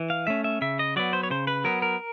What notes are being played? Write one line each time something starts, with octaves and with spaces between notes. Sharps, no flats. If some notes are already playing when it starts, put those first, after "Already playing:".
Already playing: E3
F5
A3 C#4 E5
E5
C#3 E5
D#5
F#3 B3 D5
C5
C#5
C#3 C5
B4
F#3 B3 A#4
A#4